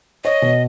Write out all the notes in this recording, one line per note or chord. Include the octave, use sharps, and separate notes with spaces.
C#5 D#5
B2